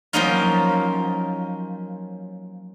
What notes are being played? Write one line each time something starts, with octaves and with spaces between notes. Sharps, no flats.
F3 F#3 A#3 C#4 D#4 F4